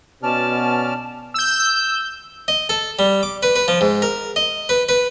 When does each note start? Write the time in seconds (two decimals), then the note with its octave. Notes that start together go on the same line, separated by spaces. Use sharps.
0.23 B2 C#4 D5 A5 F6
1.34 E6 G6
2.48 D#5
2.69 A4
2.99 G3
3.23 D6
3.43 B4
3.56 B4
3.68 F3
3.81 G#2
4.02 A#4
4.36 D#5
4.69 B4
4.89 B4